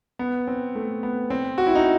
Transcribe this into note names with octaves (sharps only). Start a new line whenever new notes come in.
B3
C4
A3
B3
C4
F#4
E4
D#4